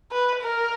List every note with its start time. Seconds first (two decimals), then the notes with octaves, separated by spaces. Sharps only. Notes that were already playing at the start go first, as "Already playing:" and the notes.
0.11 B4
0.42 A#4